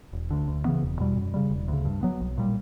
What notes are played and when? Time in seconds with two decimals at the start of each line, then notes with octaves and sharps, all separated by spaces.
0.13 E1
0.30 D2 D3
0.48 D2
0.65 C#3 E3 B3
0.82 E1
0.99 E2 B2 G3
1.17 F#2
1.34 C#3 G3
1.51 E1
1.68 D2 C#3
1.85 G2
2.03 F#3 B3
2.21 B1
2.38 A#2 G3